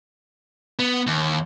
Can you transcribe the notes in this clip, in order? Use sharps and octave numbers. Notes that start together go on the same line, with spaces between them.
B3
D#2